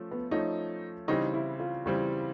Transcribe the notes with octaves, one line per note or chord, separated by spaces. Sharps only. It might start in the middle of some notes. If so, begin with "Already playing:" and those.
Already playing: F3 A3 C#4
B3
F3 A3 C#4 D#4
C#3 E3 G3 C4 D#4
E4
F4
C#3 E3 G3 C4